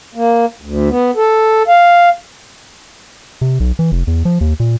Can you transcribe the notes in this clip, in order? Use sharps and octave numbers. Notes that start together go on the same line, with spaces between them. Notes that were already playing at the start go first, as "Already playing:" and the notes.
A#3
D2
B3
A4
F5
C3
B1
E3
F1
E2
F3
D#2
A#2